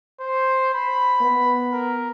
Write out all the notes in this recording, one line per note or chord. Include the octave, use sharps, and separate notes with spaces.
C5
B5
B3
A#4